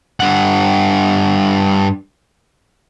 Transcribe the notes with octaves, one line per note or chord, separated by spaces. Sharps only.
G2 F#5